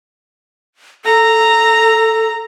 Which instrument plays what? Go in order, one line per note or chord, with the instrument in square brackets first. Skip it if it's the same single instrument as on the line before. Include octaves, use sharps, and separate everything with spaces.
[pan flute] A4 [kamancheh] A#5